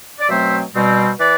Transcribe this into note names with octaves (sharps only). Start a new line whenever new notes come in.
D5
B2 F#3 A3 C4 C5 E5
B2 G3 C4
E3 B4 D5